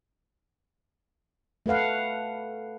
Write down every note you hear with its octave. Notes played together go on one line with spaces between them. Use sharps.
A3 A4 B4 F5 F#5